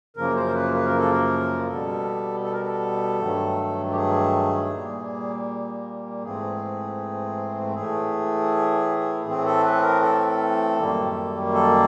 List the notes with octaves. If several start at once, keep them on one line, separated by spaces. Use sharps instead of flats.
F#2 C#3 F3 A#3 A#4
C5
A#4
B4
B4
A#4
A4
A#4
B2 G3 B3 A4
A4
A#4
A4
G2 D#3 F#3 A3
G4
G#4
A#2 G3 A#3
G#2 E3 A3 C4 G#4
A2 E3 A3 G#4
A2 E3 A3 C4 G#4
A4
B4
A#4
A4
F#2 D#3 G3 A#3
A4